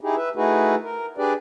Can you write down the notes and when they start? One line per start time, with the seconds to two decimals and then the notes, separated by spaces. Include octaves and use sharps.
0.01 D#4 E4 G4 G#4
0.16 B4 E5
0.36 A3 D#4 E4 F#4 G#4 B4
0.84 A#4
1.18 D4 G4 G#4 B4 D5